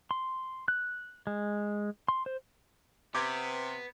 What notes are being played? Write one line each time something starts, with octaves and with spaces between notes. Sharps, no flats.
C6
F#6
G#3
C6
C5
C3 B3 D6 G6 G#6